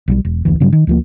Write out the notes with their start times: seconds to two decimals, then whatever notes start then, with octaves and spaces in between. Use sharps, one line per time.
0.08 B1 F3 G3
0.25 E1
0.45 F1 D2 E3
0.60 G2 C#3 F#3 G3
0.73 D#3
0.87 D2 F3 A#3